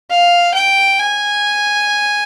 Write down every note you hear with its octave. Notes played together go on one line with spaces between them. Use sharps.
F5
G5
G#5